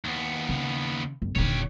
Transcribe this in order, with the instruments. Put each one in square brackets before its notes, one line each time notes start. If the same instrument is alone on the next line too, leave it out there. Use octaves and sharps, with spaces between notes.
[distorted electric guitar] D#2 B3
[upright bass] C#3
F#1
[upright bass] D#1 D3 [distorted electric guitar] G4 C#5